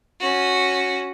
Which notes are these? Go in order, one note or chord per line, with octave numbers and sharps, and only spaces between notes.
C#4 F#4